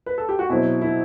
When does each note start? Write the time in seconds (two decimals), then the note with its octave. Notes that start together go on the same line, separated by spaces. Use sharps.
0.06 B4
0.18 A4
0.29 G4
0.39 F#4
0.50 B2 F#3 C4 E4
0.82 E4